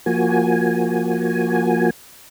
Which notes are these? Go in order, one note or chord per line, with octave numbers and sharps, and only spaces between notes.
F3 A#3 F#4 G#5